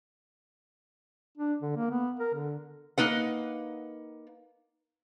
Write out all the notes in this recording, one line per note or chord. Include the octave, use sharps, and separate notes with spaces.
D4
D3
A#3
B3
A#4
D3
A#3 D#4 B4 F#5